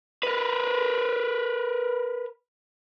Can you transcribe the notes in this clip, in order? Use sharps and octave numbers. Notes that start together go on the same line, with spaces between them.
A#4 B4